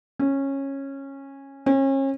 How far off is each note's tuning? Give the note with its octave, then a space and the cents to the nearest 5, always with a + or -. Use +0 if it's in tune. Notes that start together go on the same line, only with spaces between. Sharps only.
C#4 -15
C#4 -35